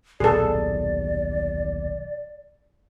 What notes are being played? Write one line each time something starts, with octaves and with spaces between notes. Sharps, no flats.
D#1 B1 G#4 A4 D5